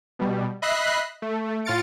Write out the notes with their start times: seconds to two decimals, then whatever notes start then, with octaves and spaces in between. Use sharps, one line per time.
0.19 B2 G3
0.62 D#5 E5 B5 F#6 A#6 C7
1.22 A3
1.65 A2 F4 F6 A6 C#7 D7